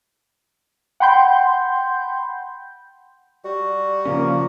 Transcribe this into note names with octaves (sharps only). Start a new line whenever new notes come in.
F#5 G5 B5 C6 G6
G3 F#4
C#3 F3 A#3 C#4